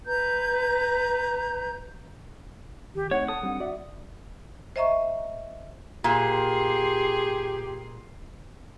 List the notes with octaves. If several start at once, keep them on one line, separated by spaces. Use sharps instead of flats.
B4 A#5 G6
C#2 D#3 G4
A3 C4 D#4 C#5 F#5
A4 A5 D#6
G3 C4 D4
F#4 D5 E5
C5 D#5 E5 A#5 C#6
A#2 G4 G#4 C6